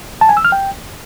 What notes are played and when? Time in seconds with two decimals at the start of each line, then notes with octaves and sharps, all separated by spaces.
0.21 A5
0.29 G#5
0.37 E6
0.45 F6
0.52 G5